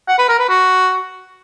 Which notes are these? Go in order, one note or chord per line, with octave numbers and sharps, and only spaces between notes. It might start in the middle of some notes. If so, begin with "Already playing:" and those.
F#5
B4
A#4
B4
F#4